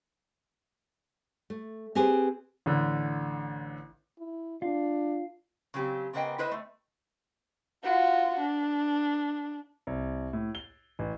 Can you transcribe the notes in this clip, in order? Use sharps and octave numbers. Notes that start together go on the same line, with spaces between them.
A3
C4 G4 G#4 B4 C5
A1 D3
E4
D4 F4
C#3 F#3 C4 G4
C#3 A#3 B3 C5 D#5 G5
E4 B4 C5 D#5
A3
F4 F#4
D4
C2
A2
G7
A1